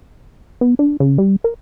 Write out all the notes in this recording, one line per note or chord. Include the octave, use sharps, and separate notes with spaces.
B3
D4
C#3
G3
A#4